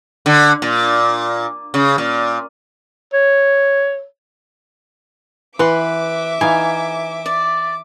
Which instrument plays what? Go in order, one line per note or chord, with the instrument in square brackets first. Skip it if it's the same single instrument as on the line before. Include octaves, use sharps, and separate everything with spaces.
[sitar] D3
A#2
C#3
A#2
[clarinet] C#5
[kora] E3 F#5 [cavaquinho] B4 C6 [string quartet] E5 D6
[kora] E3 D#4 F5 [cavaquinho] G#5
[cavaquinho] D5